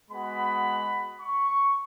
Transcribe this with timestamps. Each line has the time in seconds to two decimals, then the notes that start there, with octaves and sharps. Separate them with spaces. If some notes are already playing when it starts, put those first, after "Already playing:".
0.11 G#3 B3 F#4 B5
1.21 C#6